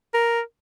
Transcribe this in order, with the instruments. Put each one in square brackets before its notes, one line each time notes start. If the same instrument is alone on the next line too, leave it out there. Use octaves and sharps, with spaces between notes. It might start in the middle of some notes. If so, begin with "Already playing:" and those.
[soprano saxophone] A#4